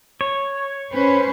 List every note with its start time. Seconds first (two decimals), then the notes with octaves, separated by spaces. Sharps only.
0.21 C#5
0.92 C#4 B4 C5